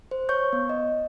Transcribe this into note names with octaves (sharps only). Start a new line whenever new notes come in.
C5
C#5 C#6 G6
B3
D#5